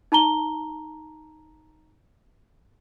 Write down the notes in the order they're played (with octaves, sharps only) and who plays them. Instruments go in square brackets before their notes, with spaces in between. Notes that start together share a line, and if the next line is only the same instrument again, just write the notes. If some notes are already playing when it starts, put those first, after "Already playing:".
[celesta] D#4 A5 A#5 G7